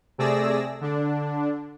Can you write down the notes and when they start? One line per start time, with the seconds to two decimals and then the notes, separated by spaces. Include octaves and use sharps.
0.18 C3 A3 G#4 D5 E6 A#6
0.81 D3 D4